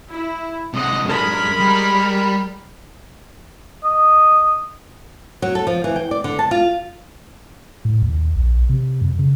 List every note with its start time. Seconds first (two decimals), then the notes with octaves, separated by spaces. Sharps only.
0.11 E4
0.74 C3 G#3 D#5 F#5
1.05 F#2 G#3 D4 A#4 B5
1.60 G3
3.84 D#5
5.42 F#3
5.55 A4
5.67 F3
5.84 E3
5.96 G5
6.11 D5
6.24 D3
6.39 A5
6.51 F4
7.85 A2
8.02 D#2
8.36 A#1
8.69 C3
9.01 F#2
9.19 C#3